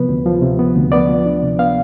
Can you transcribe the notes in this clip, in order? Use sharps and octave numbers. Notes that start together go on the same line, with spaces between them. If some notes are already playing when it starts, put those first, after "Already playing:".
Already playing: C3 F3 B3 B4
D2
F3
C3
B3
D2
B3 D5
F3
D4
C3
B3 F5